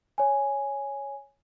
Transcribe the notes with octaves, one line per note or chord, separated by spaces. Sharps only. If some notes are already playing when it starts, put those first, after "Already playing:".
C#5 G#5